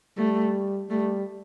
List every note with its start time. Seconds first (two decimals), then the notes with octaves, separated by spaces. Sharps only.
0.18 G3 A3
0.90 G3 A3